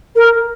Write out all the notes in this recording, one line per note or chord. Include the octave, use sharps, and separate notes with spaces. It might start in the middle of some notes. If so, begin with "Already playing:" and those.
A#4